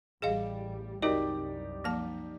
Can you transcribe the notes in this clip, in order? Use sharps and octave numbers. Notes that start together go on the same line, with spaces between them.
A1 G3 G#4 D#5 F5
C2 F#2 D#4 F#4 G4 A#4 D5 D#5
F3 A#3 A5